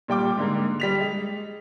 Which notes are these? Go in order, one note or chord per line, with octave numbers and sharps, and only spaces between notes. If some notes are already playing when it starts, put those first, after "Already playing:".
A#2 G3 G5 D6
G#2 D3 A#3
G3 B6 F7
G#3